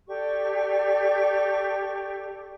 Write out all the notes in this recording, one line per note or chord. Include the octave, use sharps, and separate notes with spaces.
G4 A4 D5 C#6